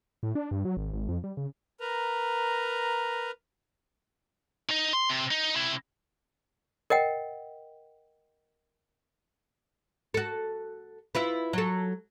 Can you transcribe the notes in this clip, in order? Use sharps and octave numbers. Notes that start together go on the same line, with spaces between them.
A2
D4
G2
F#3
G#1
G#1
F2
G3
C#3
A#4 B4 A#5
D#4 D#5
C6
C3
D#4
C3 E4
A#4 D#5 F#5 G5
F#4 A4
E4 F4 B4
F#3 A4